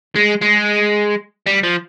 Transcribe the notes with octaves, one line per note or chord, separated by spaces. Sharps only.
G#3
G#3
G3
F3